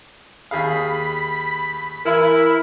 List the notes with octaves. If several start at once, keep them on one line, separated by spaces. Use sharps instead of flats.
D#2 G#4 F5 B5
E3 E4 A#4